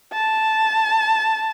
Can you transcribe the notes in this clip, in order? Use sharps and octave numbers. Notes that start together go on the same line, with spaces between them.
A5